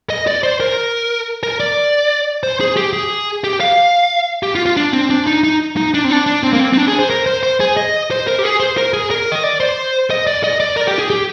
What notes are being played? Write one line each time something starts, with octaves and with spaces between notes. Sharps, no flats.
D#5
D5
C5
A#4
A#4
D5
C5
G#4
G4
G#4
G4
F5
G4
F4
F4
D4
C4
D4
D#4
D#4
D#4
D4
C4
D4
D4
C4
A#3
C4
C4
D4
G#4
C5
A#4
C5
C5
G#4
D#5
C5
A#4
G4
G#4
C5
A#4
G#4
A#4
D#5
D5
C5
D#5
D5
D#5
D5
A#4
G4
G#4
G4